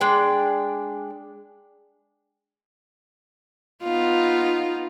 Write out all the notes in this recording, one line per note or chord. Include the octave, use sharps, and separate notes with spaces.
G#3 D4 G5
B3 D#4 F4